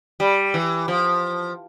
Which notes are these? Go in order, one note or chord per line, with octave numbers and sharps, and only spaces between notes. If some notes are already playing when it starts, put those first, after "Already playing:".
G3
E3
F3